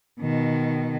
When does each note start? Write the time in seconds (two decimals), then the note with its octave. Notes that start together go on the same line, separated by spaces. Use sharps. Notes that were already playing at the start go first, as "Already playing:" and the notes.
0.20 B2 D#3